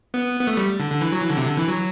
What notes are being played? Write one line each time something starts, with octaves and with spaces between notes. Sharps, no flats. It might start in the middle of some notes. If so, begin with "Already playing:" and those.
B3
B3
A3
G3
D3
D3
E3
F#3
E3
D3
C3
D3
E3
F#3